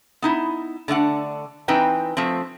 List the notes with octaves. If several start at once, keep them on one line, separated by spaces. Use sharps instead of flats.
B3 D#4 E4
D3 A3 D4 F#5
E3 C4 D#4 B4 G5
F3 A3 C4